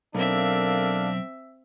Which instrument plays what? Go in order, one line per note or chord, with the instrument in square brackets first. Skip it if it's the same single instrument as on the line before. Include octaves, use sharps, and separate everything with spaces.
[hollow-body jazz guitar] B1 [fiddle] C4 E5 [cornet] D4 [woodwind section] A4 A#4 F5